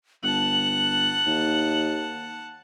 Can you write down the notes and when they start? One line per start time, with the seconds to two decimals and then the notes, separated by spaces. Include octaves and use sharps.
0.23 G1 F#5 A5 F#7
1.26 D#2